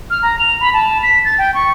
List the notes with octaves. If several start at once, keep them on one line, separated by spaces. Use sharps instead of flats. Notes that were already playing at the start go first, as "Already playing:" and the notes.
F6
A#5
F7
B5
A5
B6
A6
G5
C#6